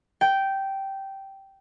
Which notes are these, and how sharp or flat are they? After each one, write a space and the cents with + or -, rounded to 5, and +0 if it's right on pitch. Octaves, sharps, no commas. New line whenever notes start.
G5 -10